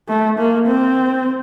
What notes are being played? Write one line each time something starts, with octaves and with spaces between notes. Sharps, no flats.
A3
A#3
C4